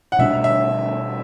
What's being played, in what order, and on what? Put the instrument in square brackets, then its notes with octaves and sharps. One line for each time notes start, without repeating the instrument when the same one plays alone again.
[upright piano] F#5
[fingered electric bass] B2 G3 B3 D4 [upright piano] E5
[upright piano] E5